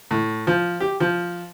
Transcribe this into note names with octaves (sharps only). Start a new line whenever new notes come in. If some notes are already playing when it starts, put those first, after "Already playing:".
A2
F3
G4
F3